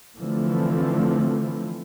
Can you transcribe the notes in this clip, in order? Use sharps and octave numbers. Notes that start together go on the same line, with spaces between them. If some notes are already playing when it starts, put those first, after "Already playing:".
D3 E3 F3 A3 C4